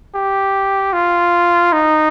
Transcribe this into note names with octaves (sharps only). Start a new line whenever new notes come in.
G4
F4
D#4